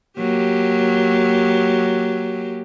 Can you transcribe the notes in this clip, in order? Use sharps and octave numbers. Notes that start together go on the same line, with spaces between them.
F#3 A#3 G4